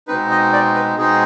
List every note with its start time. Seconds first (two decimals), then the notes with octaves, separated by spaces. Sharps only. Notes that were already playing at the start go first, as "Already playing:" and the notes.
0.08 B2 G#3 C4 D#4 B4
0.30 D#5
0.52 D5
0.75 B4
0.97 B2 G#3 C4 D#4 G#4